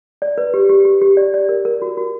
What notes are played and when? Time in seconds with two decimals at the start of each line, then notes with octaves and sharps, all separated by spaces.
0.22 D5
0.38 B4
0.54 G4
0.70 G4
0.85 G4
1.02 G4
1.17 D5
1.34 D5
1.49 A#4
1.65 A#4
1.82 F#4
1.97 F#4